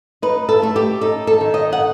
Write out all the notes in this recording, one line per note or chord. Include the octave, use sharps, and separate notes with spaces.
D#4 B4
A4
A3 A4
G4
D#4 A4
A4
D#3
D#5
F#5